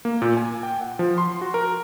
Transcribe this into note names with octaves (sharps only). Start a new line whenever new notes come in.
A#3
A#2
G#5
G5
F#5
F3
C6
F#4
A#4